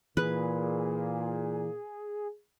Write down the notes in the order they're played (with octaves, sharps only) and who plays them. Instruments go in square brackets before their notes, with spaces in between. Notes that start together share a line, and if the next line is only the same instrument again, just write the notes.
[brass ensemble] A#2 [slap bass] E3 [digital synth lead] G#4 [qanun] B4